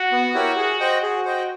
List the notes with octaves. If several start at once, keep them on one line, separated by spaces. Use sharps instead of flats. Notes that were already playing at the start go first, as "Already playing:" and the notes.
Already playing: F#4
B3
E4 G4 A#4 C#5
G#4
C5 D#5 G5
F#4 G#4
C5 D#5 G5